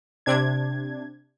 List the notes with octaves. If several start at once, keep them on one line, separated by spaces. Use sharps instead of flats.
C3 D4 G#6